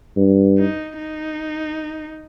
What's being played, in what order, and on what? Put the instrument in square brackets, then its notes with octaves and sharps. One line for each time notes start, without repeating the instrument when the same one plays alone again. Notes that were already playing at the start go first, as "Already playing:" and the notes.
[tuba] G2
[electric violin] D#4
D#4